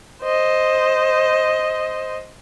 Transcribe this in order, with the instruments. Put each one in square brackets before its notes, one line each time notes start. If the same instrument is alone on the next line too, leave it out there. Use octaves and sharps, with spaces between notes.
[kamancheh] C5 D#5